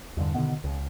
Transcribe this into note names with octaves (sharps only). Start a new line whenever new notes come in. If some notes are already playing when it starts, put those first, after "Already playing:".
E2 G2 D3
B2 D3 D#3 B3
C#2